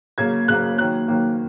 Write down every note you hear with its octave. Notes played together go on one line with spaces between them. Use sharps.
C#3 F#3 A#3 G#6
C#3 F#3 A#3 F#6
D#3 F#3 A#3 F#6
D#3 F#3 A#3